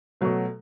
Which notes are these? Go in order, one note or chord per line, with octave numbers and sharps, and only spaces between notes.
B2 F#3 A3